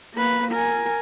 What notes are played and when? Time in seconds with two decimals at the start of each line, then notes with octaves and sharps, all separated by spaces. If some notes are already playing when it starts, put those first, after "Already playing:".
0.14 A#3 B4
0.51 A#4 G#5